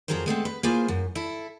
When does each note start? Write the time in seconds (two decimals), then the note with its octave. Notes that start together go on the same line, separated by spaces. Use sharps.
0.08 F2 A#2 F#3 G#4 A#4 C5
0.26 G#3 A3 B3 C4
0.45 B4
0.63 A#3 E4 F4 G#4 C5 G#5
0.88 F#2
1.15 E4 A4